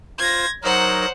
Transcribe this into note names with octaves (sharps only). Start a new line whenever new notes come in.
F4 C5 G#6 A#6
F#3 D#4 A#4 C5 F#5